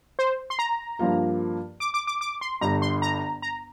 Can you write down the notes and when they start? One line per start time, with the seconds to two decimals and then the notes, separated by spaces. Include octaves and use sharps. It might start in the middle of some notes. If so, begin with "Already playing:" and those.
0.19 C5
0.50 C6
0.59 A#5
0.99 G2 F3 A#3 F4
1.80 D6
1.94 D6
2.07 D6
2.21 D6
2.41 C6
2.61 G1 G2 D3 A#5
2.82 C6
3.02 A#5
3.42 A#5